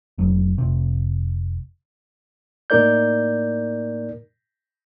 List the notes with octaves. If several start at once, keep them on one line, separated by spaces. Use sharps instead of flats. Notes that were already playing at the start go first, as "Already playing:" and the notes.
F1 F#3
F1 C3
A2 A#3 D#4 A#4 D5 G6